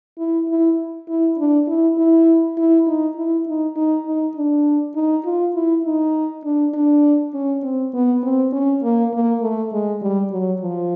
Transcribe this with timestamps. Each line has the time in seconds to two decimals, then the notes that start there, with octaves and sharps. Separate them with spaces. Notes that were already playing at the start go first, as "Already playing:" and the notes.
0.18 E4
0.49 E4
1.08 E4
1.38 D4
1.67 E4
1.98 E4
2.57 E4
2.87 D#4
3.16 E4
3.47 D#4
3.76 D#4
4.06 D#4
4.36 D4
4.95 D#4
5.25 F4
5.55 E4
5.85 D#4
6.44 D4
6.74 D4
7.34 C#4
7.63 C4
7.94 B3
8.23 C4
8.52 C#4
8.83 A#3
9.13 A#3
9.42 A3
9.72 G#3
10.01 G3
10.31 F#3
10.61 F3